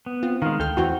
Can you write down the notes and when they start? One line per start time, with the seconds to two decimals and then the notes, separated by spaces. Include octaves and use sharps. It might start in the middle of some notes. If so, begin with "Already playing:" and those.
0.06 B3
0.23 C4 F4
0.42 D#3 G#3 F5
0.60 D2 A4 G5 F6
0.77 E2 E3 C4 F#4